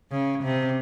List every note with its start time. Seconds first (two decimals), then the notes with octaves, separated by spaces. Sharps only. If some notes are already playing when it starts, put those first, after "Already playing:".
0.12 C#3
0.44 C3